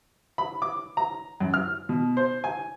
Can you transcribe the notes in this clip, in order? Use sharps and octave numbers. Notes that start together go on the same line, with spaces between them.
B5
D6
A#5
F#2
F6
B2
C5
G#5